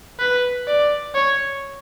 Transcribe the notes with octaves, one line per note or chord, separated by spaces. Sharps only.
B4
D5
C#5